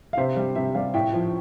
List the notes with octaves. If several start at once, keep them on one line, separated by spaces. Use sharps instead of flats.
F5
C3 C5 E5
G3
C3 C5 E5
G3 D5 F5
A2 E5 G5
F3